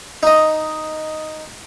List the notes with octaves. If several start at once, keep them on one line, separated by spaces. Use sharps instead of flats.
D#4 D#5